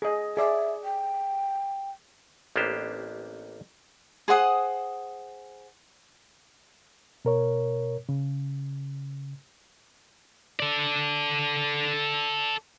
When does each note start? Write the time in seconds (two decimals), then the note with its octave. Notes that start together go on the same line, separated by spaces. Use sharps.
0.02 G#4 D#5
0.37 G#4 D5 E5
0.84 G5
2.56 A1 A#3 B3 D4 G4 C5
4.28 G#4 C5 F#5 D#6
7.25 B2 A#4 C#5
8.09 C#3
10.60 A4 D5